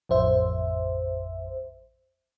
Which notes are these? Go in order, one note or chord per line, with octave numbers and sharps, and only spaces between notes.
A1 F2 C5 E5